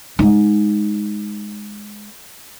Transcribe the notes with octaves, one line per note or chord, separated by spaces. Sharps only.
G#3 D#4